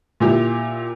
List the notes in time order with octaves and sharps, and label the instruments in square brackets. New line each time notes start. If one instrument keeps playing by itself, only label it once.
[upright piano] A#2 E4 G4